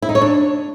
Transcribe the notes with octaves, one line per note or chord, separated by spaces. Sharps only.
E4
D#4
C#5
D4